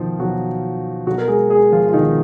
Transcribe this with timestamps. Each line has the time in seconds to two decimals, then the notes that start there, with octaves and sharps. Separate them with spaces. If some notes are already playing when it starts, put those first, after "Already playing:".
Already playing: B2 D#3 F3 D#4 F4
0.19 B2 F#3 F#4
1.06 B2 F#3 F#4
1.18 A#4
1.28 G#3 G#4
1.50 G#3 G#4
1.72 F3 F4
1.89 F4
1.93 B2 D#3 D#4